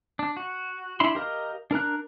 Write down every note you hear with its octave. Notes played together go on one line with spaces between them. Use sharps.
D4
F#4
D4 E4 B5 C6
G4 A#4 D#5 F5
D4 A#4 A#5 F#6